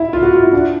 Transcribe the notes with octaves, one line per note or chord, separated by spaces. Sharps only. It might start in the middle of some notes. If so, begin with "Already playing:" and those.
Already playing: E4
F4
F#4
F4
E4
D4